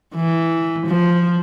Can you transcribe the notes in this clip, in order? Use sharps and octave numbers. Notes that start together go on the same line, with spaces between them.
E3
F3